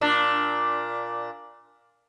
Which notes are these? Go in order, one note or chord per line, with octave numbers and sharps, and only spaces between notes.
A#2 D4